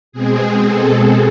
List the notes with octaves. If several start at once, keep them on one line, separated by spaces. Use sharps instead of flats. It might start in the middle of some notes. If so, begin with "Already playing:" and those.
B2 G#3 C4 G#4
A4